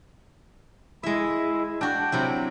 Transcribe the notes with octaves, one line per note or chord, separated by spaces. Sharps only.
G#3 E4 E5
D4 F#4 G5
C3 F#3 E4